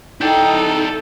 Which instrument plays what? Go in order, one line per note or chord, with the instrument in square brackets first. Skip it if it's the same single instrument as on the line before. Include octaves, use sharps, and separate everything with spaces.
[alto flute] D#4 [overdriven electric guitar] E4 D5 [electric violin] A4 [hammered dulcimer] G5